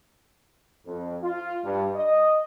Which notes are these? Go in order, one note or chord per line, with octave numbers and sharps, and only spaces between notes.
F2
F4
G2
D#5